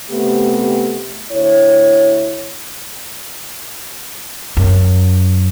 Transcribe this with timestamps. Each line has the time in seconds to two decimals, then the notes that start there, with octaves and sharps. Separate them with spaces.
0.10 C3 A3 B3 G4
1.32 D2 E4 C#5
4.57 F#2